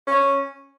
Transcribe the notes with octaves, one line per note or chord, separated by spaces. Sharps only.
C#4